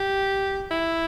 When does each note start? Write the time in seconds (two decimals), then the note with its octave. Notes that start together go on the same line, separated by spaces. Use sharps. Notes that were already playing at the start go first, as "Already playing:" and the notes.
Already playing: G4
0.71 E4